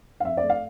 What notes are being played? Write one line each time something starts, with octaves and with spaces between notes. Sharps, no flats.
F5
F2 E5
D5
A3
F5